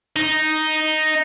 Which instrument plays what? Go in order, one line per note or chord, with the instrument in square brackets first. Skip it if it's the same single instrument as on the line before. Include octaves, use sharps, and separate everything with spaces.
[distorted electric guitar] D#4